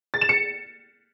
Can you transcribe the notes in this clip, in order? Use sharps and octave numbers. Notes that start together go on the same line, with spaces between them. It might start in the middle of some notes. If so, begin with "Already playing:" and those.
A6
E7
C#7